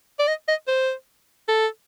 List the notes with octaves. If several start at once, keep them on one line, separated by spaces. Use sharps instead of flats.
D5
D#5
D#5
C5
A4